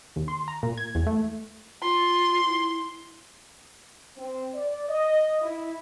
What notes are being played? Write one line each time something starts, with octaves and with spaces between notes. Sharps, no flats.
D#2
C6
A#5
A#2
G#6
E2
A3
F4 C6
E4
C4
D5
D#5
E4